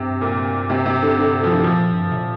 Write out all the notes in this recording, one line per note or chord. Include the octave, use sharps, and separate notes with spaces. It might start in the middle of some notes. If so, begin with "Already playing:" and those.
Already playing: G2 C3
A#2
C3
C3
D3
D3
F3
D3
A#2 F3
G2
C3
A#2